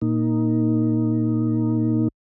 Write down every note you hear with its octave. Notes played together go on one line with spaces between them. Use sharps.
A#2 A#3 D#4